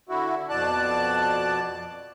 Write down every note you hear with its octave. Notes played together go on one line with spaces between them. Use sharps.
D3 E4 F#4
F2 B2 D5 A5 F#6